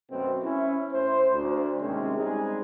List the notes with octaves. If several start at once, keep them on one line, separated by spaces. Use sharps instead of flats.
F#2 B2 A3 C4
C#4 E4
A2 E4 C5
D2
D#2 C3 D#3 G#3 C#4
G3 G#3 C4 D#4 G#4